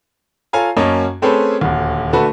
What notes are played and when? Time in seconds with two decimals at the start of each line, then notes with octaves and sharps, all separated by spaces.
0.53 F4 A4 C#5 F5 G#5 A#5
0.77 F#2 A#3 C#4 D#5 A5
1.22 A3 C4 C#4 G#4 A4 B4
1.61 D#1 D2
2.13 D3 A3 F#4 B4 A5